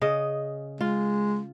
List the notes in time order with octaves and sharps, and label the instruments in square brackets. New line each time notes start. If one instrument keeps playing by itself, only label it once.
[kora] C#3 D#5
[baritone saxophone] G#3 [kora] F4